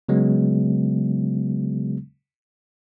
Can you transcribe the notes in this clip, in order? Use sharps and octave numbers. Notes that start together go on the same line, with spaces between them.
C#3 F#3 G#3 B3